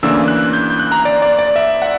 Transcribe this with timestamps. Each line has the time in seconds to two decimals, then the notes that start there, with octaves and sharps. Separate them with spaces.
0.03 D2 C#3 E3 A#3 D4 E6
0.28 F#6
0.53 G6
0.70 G6
0.79 F#6
0.92 A#5
1.05 D5
1.22 D5
1.39 D5
1.56 E5
1.82 F#5